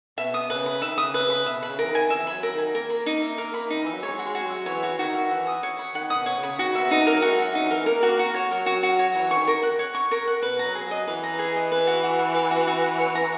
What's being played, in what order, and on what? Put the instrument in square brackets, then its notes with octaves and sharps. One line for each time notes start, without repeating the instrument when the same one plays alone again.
[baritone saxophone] B2 [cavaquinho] E5
[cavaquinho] D#6
[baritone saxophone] C#3 [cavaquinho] B4
[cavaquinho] B5
[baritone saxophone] D#3 [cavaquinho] E5
[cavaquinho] D#6
[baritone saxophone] C#3
[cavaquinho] B4
[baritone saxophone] C#3
[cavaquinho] B5
[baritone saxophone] B2 [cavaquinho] E5
[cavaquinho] B5
[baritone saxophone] C#3
[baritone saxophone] E3 [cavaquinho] A#4
[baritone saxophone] D#3
[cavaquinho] G#5
[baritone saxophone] E3 [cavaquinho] E5
[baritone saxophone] F#3 [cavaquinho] B5
[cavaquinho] A#4
[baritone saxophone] D#3
[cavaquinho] G#5
[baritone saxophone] A#3 [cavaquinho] A#4
[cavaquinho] B5
D#4
E5
A#4
B5
[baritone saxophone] D#3 [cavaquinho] D#4
[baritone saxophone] E3 [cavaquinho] E5
[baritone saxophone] F#3
[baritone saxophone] G#3 [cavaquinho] C#5
[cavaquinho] F#4
[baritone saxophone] G#3
[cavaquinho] F#4
[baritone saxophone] F#3 [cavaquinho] E5
[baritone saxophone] E3 [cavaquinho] C#5
[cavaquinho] F#4
[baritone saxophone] D#3 [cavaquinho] F#4
[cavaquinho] E5
[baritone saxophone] E3 [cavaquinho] F#5
[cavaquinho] D#6
C#5
B5
[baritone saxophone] D#3 [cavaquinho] F#5
[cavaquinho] D#6
[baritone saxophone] B2
[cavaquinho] C#5
[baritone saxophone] C#3
[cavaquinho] B5
[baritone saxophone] D#3 [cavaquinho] F#4
[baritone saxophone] A#3 [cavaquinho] E5
[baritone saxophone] B3
[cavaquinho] D#4
[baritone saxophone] A#3 [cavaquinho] A#4
[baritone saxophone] F#3
[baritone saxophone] G#3 [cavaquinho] F#4
[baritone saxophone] F#3 [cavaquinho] E5
[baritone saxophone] F#3 [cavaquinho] D#4
[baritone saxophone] E3
[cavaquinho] A#4
[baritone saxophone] A#3 [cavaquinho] A#4
[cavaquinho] F#4
[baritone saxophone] A#3
[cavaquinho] F#4
C#5
[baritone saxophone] F#3 [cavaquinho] A#4
[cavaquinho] F#4
F#4
C#5
[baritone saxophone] E3 [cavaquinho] C#5
[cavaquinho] C#6
[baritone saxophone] D#3
[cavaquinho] A#4
F#5
C#5
C#6
A#4
F#5
[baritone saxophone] B2 [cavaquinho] B4
[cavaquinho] A#5
[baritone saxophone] F#3
[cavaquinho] G#4
[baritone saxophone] F#3 [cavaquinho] D#5
[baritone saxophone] E3 [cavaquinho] B4
[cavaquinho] A#5
G#4
D#5
B4
F#4
F#4
F#5
B4
F#4
F#4
F#5
C#5
A#5